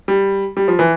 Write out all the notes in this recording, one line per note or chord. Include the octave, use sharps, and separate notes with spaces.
G3
G3
F3
E3